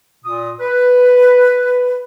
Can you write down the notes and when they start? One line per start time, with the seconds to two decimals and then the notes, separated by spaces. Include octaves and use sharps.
0.25 A#2 D#6
0.60 B4